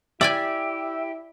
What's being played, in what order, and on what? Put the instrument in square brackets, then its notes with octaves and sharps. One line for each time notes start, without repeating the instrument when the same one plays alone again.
[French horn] E4 [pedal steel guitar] G4 [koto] D5 G5 G#5 [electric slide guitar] E5